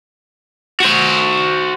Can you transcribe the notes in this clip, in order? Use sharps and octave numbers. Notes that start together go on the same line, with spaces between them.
F#4 C5